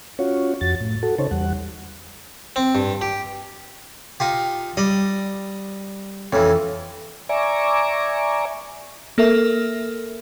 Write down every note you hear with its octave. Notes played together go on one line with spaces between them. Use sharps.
C#4 F4 F#4 C#5
F2 F#4 A6
A2
F#4 A4
C#3 D#4 C5 C#5 A5
E2 G3 F#5
C4
G2
G4
D#4 F4 G4
G3 D5 D#5
F2 E3 C#4
D5 E5 G#5 A#5 C#6 D6
A#3 A4 A#4 E5